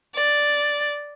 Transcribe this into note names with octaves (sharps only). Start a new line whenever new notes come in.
D5